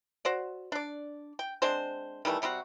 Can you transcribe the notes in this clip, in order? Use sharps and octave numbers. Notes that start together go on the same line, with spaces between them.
F#4 C5 D5
D4 D5
G5
G#3 C4 D4 C5
D#3 E3 G3 A3
C3 G3 C4 F#4